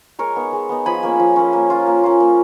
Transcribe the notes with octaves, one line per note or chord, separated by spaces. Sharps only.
G#3 A#4 C#5
B3 D#4
G#3
B3 D#4
F3 G#5 B5
A#3 C#4
F3
A#3 C#4
A#3
C#4 F4
A#3
C#4 F4
A#3